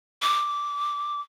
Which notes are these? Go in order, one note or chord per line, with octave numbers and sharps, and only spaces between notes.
D6